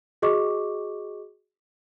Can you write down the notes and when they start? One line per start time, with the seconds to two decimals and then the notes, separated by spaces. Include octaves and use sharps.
0.22 F#4 G#4 D#5 C#6 D6